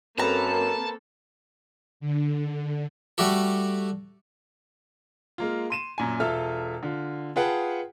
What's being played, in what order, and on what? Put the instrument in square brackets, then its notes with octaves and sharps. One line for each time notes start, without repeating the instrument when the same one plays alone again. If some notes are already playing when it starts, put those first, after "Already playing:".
[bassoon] F#2 [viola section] A#3 C4 A4 [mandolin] B4 A#5 [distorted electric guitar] A5
[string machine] D3
[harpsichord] G3 A3 F#4 G4 A4
[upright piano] G#3 A#3 F4
C6 D#7 E7
F#2 A#2 G#5
E1 F4 A4 E5 F6
D3 F4
F4 G#4 B4 F#5 G5 A5